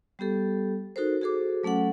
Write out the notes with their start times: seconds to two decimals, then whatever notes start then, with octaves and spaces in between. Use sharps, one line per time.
0.19 G3 B3 G4 A4
0.96 D#4 F#4 A4 A#4 C5
1.21 F#4 G#4 A4 C5 D6
1.63 F#3 A3 C#4 A4 F#5